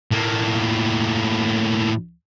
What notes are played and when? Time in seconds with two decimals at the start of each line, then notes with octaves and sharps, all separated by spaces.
0.12 A2 A#3